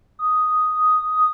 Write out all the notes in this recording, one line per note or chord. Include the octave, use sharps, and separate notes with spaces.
D#6